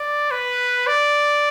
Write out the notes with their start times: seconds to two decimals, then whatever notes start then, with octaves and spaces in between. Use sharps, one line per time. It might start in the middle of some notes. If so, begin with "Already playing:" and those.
Already playing: D5
0.31 B4
0.87 D5